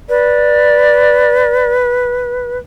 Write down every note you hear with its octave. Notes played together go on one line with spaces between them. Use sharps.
B4 D5